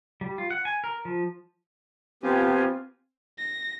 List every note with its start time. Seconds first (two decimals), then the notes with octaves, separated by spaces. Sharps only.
0.21 G3
0.38 F4
0.50 F#5
0.65 G#5
0.84 A#4
1.05 F3
2.23 F3 B3 C4 F4 G4 G#5
3.38 A#6